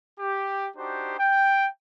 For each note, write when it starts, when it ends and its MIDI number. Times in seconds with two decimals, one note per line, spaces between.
0.20 0.68 67
0.76 1.14 62
0.76 1.14 63
0.76 1.14 66
0.76 1.14 67
0.76 1.14 72
1.19 1.68 79